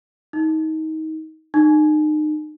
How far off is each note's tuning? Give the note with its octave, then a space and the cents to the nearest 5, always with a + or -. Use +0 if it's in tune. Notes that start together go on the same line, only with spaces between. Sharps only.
D#4 +25
D#4 -35